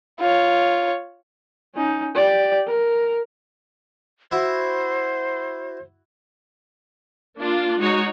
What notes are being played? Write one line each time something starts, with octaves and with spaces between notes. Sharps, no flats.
F4 C#5
C#4 D#4
G4 D5
A#4
E4 F#4 C5
A#3 D4 F4
G#3 D#4 F#4 C#5